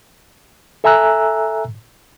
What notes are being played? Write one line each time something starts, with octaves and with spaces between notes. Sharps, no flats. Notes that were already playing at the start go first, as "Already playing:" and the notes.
A4 E5 G#5 A#5 E6 F#6